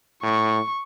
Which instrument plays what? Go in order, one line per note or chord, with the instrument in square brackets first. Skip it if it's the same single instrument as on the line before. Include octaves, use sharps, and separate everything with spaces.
[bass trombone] A2 [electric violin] C#6